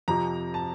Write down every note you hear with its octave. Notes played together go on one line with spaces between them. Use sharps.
F2 C3 F3 A#5
A5